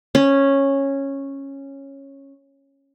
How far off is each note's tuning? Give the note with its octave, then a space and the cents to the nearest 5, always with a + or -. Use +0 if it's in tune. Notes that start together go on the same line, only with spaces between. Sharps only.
C#4 -10